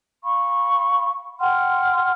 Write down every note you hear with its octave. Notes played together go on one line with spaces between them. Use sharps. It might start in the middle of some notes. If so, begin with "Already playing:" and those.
F5 B5 C#6
F#5 G5 C6 F6